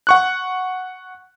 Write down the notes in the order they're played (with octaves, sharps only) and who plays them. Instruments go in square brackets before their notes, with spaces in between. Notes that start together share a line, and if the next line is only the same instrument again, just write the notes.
[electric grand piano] F#5 C#6 F#6